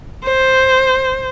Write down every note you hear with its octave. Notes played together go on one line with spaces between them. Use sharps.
C5